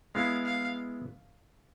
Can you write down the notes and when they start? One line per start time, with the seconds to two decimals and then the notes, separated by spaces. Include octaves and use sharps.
0.15 G#3 B3 E4 F5
0.45 F5